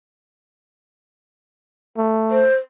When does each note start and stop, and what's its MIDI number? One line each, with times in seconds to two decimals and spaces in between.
1.97 2.46 57
2.31 2.55 72